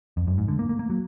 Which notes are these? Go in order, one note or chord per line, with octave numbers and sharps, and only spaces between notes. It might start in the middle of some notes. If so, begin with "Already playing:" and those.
F2
F#2
G#2
D3
A#3
A#3
A#3
F#3